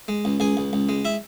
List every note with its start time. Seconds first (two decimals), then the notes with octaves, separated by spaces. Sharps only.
0.08 G#3
0.25 C#2
0.40 C#2 G#4 G#5
0.57 C#2
0.73 C#2
0.89 G#3
1.05 E4 E5